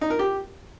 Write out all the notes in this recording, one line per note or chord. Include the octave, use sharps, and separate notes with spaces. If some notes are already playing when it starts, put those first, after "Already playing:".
D#4
A#4
G4